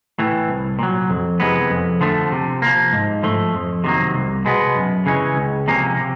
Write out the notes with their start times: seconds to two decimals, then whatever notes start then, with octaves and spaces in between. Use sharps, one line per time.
0.19 A2 E3 A3
0.48 C2
0.79 A#2 F#3
1.10 F2
1.40 C3 E3 G#3 B3
1.70 F2
2.01 D3 F3 A3
2.32 C3
2.62 F3 A#3
2.93 G#2
3.23 F3 A3
3.54 F2
3.84 C3 D#3 F#3 A#3
4.14 C2
4.45 B2 G#3 B3
4.76 F#2
5.06 C#3 E3 G#3 C#4
5.36 C#2
5.68 C3 F3 A#3 C#4
5.97 C3